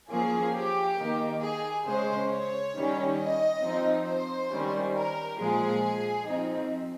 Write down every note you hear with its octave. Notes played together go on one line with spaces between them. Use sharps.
F3 A#3 C#4 G#4
G4
D#3 A#3 D#4
G#4
C#3 G#3 C#4 C5
C#5
D#3 G3 C#4
D#5
F3 C4 D#4
C5
D#3 G3 C#4
A#4
A#2 F3 G#3 G#4
F3 C4 D#4